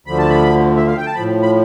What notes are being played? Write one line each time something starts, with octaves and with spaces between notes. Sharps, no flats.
D2 D3 F3 B5
A5
B5
E5
F5
G5
A5
A2 F3 B5
B5